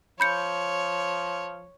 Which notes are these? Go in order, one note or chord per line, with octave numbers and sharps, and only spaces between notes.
F3 C#5 B5 G6 C#7